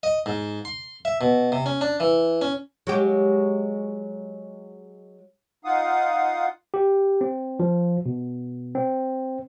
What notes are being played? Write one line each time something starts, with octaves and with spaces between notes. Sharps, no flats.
D#5
G#2
C6
E5
B2
C3
C#4
D4
E3
C#4
F#3 G#3 G4
D#4 F4 F5 F#5 D#6
G4
C4
F3
B2
C4